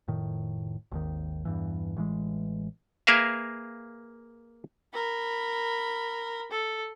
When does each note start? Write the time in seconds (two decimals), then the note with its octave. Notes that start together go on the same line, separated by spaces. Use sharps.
0.08 F1 A2 D#3
0.91 G#1 D#2 D#3
1.45 E2 G2 E3
1.96 A1 E3 G#3
3.07 A#3 G#4 A#4 B4 E5 F5
4.94 A#4 B5
6.51 A4